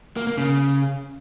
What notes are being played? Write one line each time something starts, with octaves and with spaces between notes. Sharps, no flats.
A#3
A#3
C#3